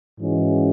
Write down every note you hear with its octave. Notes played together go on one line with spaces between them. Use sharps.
G#2 E3 G#3 C#4 F#4